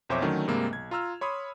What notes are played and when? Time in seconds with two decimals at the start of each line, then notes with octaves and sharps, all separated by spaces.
0.09 B1 F2 C5 C#5 E5 D6
0.22 D3 D#3 F#3 A3 C#4
0.48 G2 C3 G#3 A#3
0.71 B1 G#6
0.91 F4 A#5 E6 F6
1.21 C#5 B5 C6 D#6